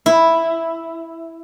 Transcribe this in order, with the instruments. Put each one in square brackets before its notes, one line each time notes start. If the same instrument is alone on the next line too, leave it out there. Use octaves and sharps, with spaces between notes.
[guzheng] E4